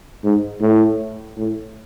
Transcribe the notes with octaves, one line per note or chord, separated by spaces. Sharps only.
G#2
A2
A2